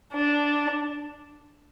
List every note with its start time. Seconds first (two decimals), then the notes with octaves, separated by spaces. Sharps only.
0.14 D4